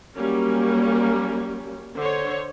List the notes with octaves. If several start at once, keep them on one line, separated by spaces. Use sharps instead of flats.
F#3 G3 A#3 C#4
D3 C5 C#5